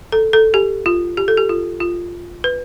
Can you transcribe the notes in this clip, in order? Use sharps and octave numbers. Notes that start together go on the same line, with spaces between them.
A4
A4
G4
F4
G4
A4
G4
F4
F4
B4